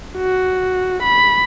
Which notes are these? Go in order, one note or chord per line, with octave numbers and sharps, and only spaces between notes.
F#4
B5